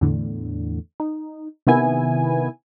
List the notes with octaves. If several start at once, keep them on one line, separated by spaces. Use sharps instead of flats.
E2 A2 D3
D#4
C3 D#3 B3 E4 G#5